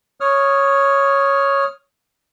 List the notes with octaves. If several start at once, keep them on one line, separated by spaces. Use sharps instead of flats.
C#5 D#6 F6